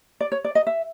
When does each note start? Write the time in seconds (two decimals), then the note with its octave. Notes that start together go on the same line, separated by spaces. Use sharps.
0.21 D5
0.32 C#5
0.44 D5
0.55 D#5
0.67 E5